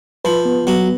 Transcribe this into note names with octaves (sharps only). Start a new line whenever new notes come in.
F3 B4
B3
F#3 B3